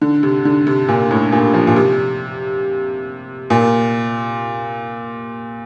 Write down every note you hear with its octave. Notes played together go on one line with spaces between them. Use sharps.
D3
C3
D3
C3
A#2
A2
A#2
F3
A#2
C3
A#2